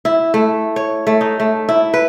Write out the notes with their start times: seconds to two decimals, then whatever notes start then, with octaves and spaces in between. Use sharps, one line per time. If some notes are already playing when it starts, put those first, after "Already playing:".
0.05 E4
0.34 A3
0.76 C#5
1.07 A3
1.21 D#4
1.40 A3
1.69 E4
1.94 B4